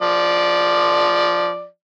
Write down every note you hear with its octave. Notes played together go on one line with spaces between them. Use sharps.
F3 D5